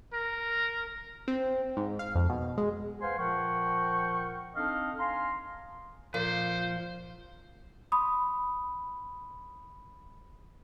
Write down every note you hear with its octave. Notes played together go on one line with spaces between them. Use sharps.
A#4
C4
G#2
F5
F2
B2
G#3
B4 C5 F5 F#5 G#5 C6
A#2 F3 A#4 F#5 G5 C#6
C4 D4 D#4 A4 D#5 F5
F5 G#5 A#5 C6
A#2 F3 C5
B5 C6 D#6